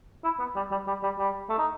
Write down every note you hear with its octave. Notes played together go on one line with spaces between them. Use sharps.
E4
B3
G3
G3
G3
G3
G3
A3
D#4